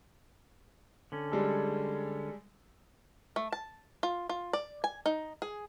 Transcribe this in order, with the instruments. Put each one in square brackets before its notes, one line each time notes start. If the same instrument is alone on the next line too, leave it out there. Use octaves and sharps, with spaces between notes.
[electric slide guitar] D3 C#4
[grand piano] G3 G#3 A4
[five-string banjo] A3
A5
F4
F4
D5
G#5
D#4
G#4